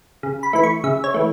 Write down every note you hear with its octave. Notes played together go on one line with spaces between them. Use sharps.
C#3
B5
E3 A3 B5
C#6
C#3 E5
C#5
E3 A3